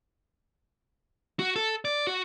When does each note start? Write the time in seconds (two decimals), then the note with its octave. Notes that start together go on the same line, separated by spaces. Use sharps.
1.39 F#4
1.56 A4
1.85 D5
2.07 F#4